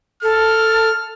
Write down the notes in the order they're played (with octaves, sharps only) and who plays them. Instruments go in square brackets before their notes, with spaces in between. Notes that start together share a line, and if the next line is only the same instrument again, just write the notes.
[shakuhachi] A4 [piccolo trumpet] F6